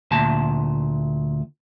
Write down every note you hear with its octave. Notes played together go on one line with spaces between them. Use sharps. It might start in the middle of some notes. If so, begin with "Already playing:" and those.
D2 A#2 A5